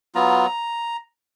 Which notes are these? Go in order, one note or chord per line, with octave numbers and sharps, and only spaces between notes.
F#3 B3 F4 A#5